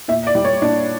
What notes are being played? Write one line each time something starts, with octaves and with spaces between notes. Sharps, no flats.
A#2 E5
D5
G3
C#5
A#2 D4